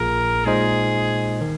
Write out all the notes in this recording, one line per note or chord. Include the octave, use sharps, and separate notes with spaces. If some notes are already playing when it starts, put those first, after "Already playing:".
Already playing: A#1 A#2 A#3 F4 G#4 A#4
A#2 G#3 D#4 G#4 C5 D#5
D#3